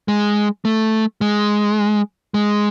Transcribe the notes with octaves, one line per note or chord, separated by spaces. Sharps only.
G#3
A3
G#3
G#3